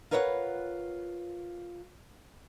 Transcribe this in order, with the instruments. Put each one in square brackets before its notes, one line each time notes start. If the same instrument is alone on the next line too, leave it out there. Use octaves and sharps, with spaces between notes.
[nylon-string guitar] F4 A#4 B4 C#5 D#5 F#5